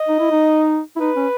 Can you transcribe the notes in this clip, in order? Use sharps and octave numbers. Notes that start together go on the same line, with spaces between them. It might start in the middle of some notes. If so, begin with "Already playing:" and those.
Already playing: D#5
D#4
E4
D#4
E4
D#4 B4
C#4